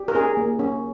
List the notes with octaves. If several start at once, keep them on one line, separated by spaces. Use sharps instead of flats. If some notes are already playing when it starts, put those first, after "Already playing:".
Already playing: G4
A#4
C#4 G#4
A#3
C#4